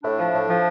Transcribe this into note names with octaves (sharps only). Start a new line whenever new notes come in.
A2 D4
F3
A2
F3